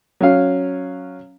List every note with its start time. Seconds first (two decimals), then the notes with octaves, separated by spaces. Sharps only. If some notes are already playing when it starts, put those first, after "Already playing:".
0.21 F#3 C#4 F5